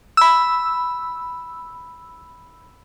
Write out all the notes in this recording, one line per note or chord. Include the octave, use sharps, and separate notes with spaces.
B5 E6